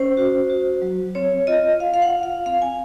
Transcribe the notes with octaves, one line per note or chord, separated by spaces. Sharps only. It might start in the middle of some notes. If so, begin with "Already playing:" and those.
Already playing: C#4 C5
F#4
F#4
F#3
C4 C#5
F4 D#5
F4 F5
F5
F#5
F4
F5
C4 F5
G#5